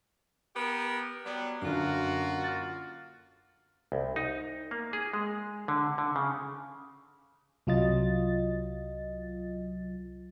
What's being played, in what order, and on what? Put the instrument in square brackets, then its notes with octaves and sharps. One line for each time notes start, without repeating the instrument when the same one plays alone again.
[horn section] B3 G4 A#4
F#3 G3 B3
[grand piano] F#2 D3 [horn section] A#3 F4 F#4
[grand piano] F6 A6
[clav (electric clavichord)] C2
D#4
A#3
G#4
G#3
D3
D3
C#3
[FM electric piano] C2 F#3 F4 D#5 A6